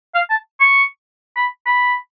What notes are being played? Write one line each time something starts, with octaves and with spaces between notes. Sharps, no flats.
F5
A5
C#6
B5
B5